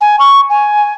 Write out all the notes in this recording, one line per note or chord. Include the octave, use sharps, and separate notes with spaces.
G#5
C#6
G#5